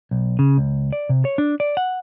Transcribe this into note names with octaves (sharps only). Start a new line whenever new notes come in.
B1
C#3
C#2
D5
C3
C#5
D4
D5
F#5